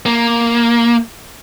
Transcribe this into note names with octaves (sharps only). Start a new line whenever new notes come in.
A#3